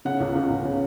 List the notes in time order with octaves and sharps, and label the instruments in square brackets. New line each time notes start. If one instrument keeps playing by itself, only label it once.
[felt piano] C#3 F#5
C#2
C#2
C#2
C#3